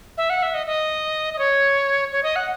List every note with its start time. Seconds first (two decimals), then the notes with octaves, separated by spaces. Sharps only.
0.18 E5
0.30 F#5
0.43 E5
0.54 D#5
0.67 D#5
1.34 D#5
1.39 C#5
2.12 C#5
2.23 D#5
2.36 F#5